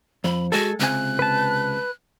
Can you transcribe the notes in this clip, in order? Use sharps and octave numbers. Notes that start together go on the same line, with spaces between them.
F2 B5
G#3 F#4 A4
C#2 C3 G#5 F#6
B4 A5